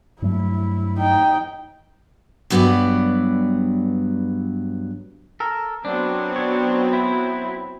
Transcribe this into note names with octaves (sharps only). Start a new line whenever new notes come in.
G2 F#3 A3 E4
D#4 G5
G2 F#3 B3 G4 B4 D5
A4 A#4
F#3 B3 C4 D4
D4 C#5
E4